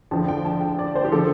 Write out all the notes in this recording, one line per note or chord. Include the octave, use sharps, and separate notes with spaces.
F2 D3 F3 A5
G5
A5
G5
D5
C5
G4
D3 F3 A4